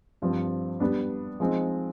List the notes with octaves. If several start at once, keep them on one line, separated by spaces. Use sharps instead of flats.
G2 F3 C4
G3 B3 D4
F3 G#3 C4 D#4